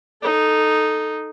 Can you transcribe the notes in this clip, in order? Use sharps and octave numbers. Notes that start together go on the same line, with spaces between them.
D#4 A4